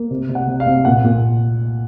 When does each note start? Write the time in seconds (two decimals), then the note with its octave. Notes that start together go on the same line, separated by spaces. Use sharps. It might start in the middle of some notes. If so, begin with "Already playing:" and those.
Already playing: A#3
0.11 C3
0.29 C3
0.35 F#5
0.48 C3
0.60 F5
0.67 C3
0.85 A#2 F#5
1.04 A#2